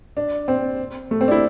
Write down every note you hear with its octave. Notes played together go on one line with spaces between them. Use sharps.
D4
C4
A3
C4
D4
E4